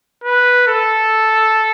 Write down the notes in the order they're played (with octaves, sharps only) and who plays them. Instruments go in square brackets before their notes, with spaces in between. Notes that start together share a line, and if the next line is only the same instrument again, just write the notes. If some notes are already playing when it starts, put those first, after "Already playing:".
[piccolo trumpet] B4
A4